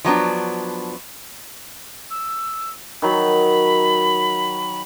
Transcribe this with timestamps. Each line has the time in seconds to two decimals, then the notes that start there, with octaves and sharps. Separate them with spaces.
0.04 F3 F#3 B3 D4
2.11 E6
3.02 D#3 F#3 B5